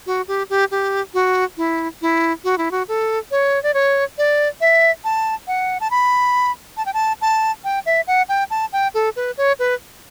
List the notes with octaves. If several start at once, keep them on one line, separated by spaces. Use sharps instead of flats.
F#4
G4
G4
G4
F#4
E4
E4
F#4
E4
F#4
A4
C#5
D5
C#5
D5
E5
A5
F#5
A5
B5
A5
G5
A5
A5
G5
E5
F#5
G5
A5
G5
A4
B4
C#5
B4